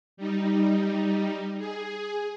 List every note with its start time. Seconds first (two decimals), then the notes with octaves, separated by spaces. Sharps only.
0.17 G3 D#4
1.59 G#4